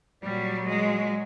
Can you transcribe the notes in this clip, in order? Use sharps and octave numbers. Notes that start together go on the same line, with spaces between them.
A#2 F#3 G3
G#3